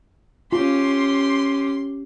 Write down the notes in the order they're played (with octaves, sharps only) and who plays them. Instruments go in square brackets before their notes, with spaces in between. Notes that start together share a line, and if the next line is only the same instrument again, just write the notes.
[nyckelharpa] C#4 G4 [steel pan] F4 [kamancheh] C6